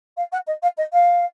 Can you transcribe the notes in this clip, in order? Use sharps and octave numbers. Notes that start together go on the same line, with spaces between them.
F5
F#5
D#5
F5
D#5
F5